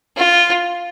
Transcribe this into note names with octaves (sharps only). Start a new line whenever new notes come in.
F4